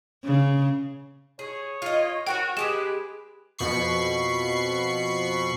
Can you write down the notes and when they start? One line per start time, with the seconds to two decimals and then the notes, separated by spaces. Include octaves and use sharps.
0.25 C#3
1.39 G#4 C#5
1.82 F4 D#5
2.27 F#4 A#4 B4 C#5 G5
2.57 G#3 G4 G#4 B4 E7
3.58 F2 B2 B5 C#6 C7